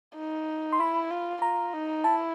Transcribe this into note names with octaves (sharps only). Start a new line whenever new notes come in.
D#4
C6
E4 B5
F4
F4 A#5
D#4
E4 A5